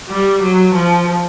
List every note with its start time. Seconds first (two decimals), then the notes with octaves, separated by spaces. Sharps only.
0.09 G3
0.42 F#3
0.74 F3